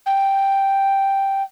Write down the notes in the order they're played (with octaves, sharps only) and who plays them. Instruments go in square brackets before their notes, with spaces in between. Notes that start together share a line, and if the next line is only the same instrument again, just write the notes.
[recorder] G5